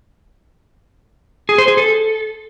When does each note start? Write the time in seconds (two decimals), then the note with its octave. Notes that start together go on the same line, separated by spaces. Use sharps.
1.49 G#4
1.58 C5
1.68 G#4
1.77 A4